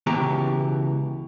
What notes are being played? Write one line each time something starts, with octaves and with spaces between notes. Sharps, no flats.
C#2 B2 E3 G4 A#5